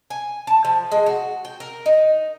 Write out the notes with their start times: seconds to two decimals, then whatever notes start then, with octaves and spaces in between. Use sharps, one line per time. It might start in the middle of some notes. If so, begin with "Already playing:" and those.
0.10 G#5
0.47 A5
0.65 F3
0.92 G#3
1.06 F#4
1.45 G5
1.60 A#4
1.86 D#4